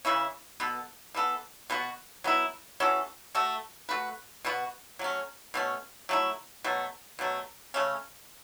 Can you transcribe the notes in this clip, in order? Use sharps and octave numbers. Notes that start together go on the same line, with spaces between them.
C#3 E3 C#4 E4
B2 B3 A4
E3 B3 A4
B2 B3 F#4
F#3 B3 E4
E3 C#4 F#4 A4
A3 F#4 A4
A3 F#4 B4
B2 B3 F#4
F#3 A3 C#4
B2 A3 C#4
F#3 A3 E4
B2 F#3 A3
B2 F#3 A3
C#3 A3 C#4